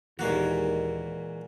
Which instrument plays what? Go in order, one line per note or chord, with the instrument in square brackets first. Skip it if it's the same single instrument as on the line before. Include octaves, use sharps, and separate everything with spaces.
[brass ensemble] D#2 [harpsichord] A#2 A#3 F#4 [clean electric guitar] E3 G#3